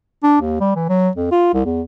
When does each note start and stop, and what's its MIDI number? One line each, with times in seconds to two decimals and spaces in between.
0.23 0.40 62
0.41 0.58 39
0.61 0.76 55
0.76 0.88 52
0.89 1.09 54
1.16 1.31 41
1.32 1.53 65
1.54 1.64 36
1.65 1.82 40